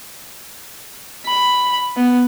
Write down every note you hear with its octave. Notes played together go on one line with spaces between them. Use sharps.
B5
B3